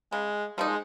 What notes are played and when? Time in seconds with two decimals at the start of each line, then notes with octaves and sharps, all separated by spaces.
0.12 C#3 G#3
0.58 F3 G3 A#3 D#4
0.68 G#3